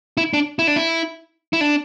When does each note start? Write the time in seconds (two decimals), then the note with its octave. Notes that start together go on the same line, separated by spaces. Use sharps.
0.17 E4
0.34 D4
0.59 E4
0.68 D4
0.76 E4
1.53 E4
1.61 D4